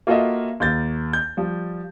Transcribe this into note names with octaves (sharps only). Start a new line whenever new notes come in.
A#3 F4 F#4 A4 D#5 E5
D#2 A#3 G6 A6
G6
F3 G3